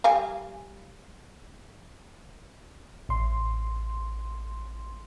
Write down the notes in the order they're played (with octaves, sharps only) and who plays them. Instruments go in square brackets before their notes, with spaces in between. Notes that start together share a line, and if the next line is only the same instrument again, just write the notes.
[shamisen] G3 F5 G#5
[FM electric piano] A1 C6